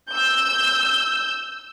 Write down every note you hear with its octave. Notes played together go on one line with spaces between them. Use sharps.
E6 G6